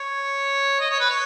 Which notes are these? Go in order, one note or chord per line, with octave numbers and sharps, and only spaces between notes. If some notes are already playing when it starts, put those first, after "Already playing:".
Already playing: C#5
D#5
C#5
B4
C#5